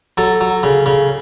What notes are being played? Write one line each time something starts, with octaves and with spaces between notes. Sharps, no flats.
F#3 A4
F#3
C#3
C#3